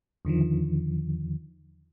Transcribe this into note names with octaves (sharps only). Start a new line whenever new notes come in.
E2 D3 D#3 F3